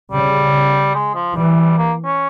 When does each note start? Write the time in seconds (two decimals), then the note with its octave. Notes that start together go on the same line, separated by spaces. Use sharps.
0.12 C#3 G3
0.95 G#3
1.15 F3
1.36 E3 G3
1.78 A#3
2.05 C#4